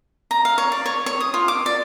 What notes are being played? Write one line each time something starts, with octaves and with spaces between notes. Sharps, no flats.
A#5
F5
C#5
D5
C#5
C#5
D#6
F4
D6
D5